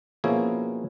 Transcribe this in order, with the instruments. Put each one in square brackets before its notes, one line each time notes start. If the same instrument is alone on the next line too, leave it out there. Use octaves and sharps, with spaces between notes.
[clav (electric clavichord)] B2 F3 A#3 C#4 E4 G#4